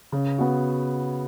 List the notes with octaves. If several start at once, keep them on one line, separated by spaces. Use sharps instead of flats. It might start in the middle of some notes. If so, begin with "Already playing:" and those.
C#3
B3 F#4